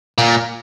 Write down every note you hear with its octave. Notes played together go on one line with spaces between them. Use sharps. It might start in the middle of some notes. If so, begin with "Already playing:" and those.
A#2